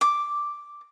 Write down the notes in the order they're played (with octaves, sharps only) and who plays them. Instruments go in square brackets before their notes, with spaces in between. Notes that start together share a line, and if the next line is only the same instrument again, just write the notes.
[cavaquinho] D6